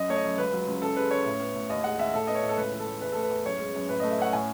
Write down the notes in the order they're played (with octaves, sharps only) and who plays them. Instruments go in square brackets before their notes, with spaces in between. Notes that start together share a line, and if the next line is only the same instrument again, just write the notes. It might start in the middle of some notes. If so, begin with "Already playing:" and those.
Already playing: [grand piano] F#2 D#5
A3 C#5
D#5
F#2
C#2 B4
F#3
C#2
F#2 A4
G#3 B4
C#4 C#5
A2
B3
A2
D#2 D#5
G#3 F#5
D#2 E5
A2 A4
B3 D#5
C#5
A2
A4
C#2 B4
E3
A4
A3
E2 B4
A3 A4
B4
E2
F#2 C#5
G#3
F#2
A2 B4
A3 D#5
E5
C#4 F#5
A2 G#5